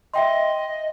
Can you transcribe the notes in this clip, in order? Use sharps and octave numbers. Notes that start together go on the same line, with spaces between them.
D#5 E5 G5 C6